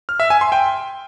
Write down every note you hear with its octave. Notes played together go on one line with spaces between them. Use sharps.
F6
E5
G#5
C6
G5